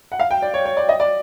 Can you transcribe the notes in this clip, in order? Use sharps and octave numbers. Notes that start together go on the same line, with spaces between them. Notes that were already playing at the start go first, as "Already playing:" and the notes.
F#5
F5
G5
D5
C#5
C#5
D5
D#5
D5